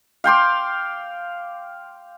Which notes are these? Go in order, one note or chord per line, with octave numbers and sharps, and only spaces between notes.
F5 G5 C6 D6